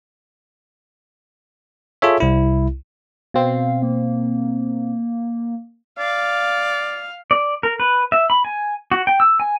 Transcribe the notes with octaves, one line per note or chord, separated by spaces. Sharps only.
F4 G#4 A4 C#5 E5
C2 E4
B2 C4 F5
A#3
D5 F5
D5
A#4
B4
E5
B5
G#5
F#4
G5
E6
G#5